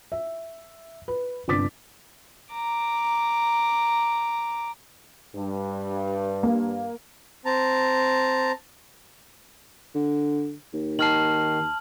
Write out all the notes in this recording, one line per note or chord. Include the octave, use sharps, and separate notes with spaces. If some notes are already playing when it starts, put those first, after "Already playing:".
E5
B4
G1 C3 D4 D6 A6 B6
A#5 D6
G2
A#3
C4 A5 A#5
D3
D#2
D#3 A5 F6 C7 F#7